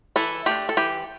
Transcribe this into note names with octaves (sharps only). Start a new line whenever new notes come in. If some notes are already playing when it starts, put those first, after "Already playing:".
E3 E4 A4
A3 D4 G4
A4
E3 G4